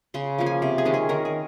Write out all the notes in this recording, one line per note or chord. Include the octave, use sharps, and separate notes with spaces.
C#3 C6
F3 A#3 C#4
G#5
C3
G#4
D#3 G#3 C#4
G#4
D#3 A#4
G#4